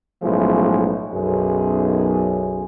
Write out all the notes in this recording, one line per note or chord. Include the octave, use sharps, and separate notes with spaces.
B1 A2 F3 G#3 C#4 E4
B1 F#2 G#4